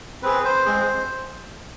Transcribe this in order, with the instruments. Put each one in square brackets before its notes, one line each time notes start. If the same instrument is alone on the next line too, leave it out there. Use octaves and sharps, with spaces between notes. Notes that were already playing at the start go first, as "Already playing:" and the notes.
[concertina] C4 G#4 B4
C5
G#3 C4 G#4